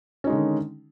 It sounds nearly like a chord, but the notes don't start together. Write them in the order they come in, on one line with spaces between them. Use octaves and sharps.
C#4 D#4 G#3 D3 D#3